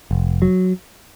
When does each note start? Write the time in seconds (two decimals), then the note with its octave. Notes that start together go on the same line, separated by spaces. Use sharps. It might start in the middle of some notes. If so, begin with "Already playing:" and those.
0.11 F1
0.42 F#3